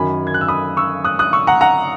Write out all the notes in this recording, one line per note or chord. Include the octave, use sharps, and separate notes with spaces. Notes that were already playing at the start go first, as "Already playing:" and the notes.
Already playing: F#2 D#3 F#3 G#5 B5
G#6
F#6
E6
B5 D#6
C#6 E6
D#6 F#6
D#6 F#6
C#6 E6
F#5 A#5
F#5 A#5